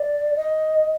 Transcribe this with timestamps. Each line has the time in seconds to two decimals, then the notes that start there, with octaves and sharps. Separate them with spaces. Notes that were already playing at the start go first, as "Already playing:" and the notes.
Already playing: D5
0.36 D#5